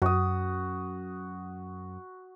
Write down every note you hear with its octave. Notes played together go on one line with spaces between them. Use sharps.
F#2 F#4 D#6